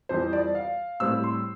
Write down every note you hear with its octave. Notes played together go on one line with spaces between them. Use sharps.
F2 E3 G3 C5
D5
F5
A2 G3 C4 E6
C6